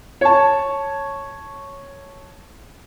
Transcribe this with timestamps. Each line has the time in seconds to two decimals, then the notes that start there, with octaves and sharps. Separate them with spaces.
0.21 C#5 A5